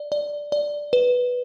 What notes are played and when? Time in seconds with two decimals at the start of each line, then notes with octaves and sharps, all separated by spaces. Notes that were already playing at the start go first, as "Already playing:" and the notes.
Already playing: D5
0.12 D5
0.52 D5
0.93 B4